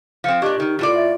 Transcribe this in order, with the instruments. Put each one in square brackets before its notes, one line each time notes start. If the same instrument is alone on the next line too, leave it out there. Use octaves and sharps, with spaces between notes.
[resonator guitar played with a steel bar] F3 C4 [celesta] F5 C#7
[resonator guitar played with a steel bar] A#2 D4 [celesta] G4 C#6 G#6 [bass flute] D#5
[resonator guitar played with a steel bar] D#3 [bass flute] D#4
[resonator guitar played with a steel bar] A2 A4 D5 [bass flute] F4
[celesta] E5 A6